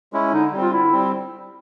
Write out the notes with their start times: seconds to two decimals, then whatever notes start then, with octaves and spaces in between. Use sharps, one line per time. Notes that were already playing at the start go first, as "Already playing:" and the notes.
0.13 G#3 C#4 E4
0.32 D3 D#4
0.52 G3 C4
0.62 F4
0.72 D3 E4
0.92 G3 C4